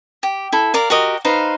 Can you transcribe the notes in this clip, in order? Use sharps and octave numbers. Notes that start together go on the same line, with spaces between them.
G4
E4 A4
A#4 D5 F5
F#4 G4 A#4 D#5
D#4 B4 C5 F5